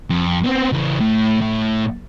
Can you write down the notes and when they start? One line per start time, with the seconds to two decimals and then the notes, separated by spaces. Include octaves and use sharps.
0.10 F2
0.44 B3 C4
0.72 C#3 E3
1.00 A2
1.41 A2